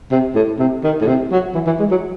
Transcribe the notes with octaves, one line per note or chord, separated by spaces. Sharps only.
C3
A2
C3
D#3
A2
C3
F#3
E3
E3
G#3
F#3